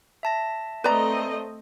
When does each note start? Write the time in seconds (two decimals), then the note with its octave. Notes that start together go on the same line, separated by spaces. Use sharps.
0.23 E5 A5 A#6
0.84 A3 C4 B4 D5 D#5 A#5